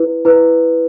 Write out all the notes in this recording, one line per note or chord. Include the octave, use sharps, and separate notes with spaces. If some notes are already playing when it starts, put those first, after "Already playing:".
Already playing: E4 B4
E4 B4